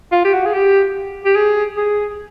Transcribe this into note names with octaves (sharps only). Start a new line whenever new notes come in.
F4
G4
F#4
G#4
G4
G4
G#4
G#4